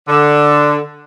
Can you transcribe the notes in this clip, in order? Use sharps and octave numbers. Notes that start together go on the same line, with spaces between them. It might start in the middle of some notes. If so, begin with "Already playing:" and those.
D3